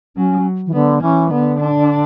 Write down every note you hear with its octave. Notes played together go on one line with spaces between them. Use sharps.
F#3 C#4
E3
D3 B3
E3 C#4
D3 B3
D4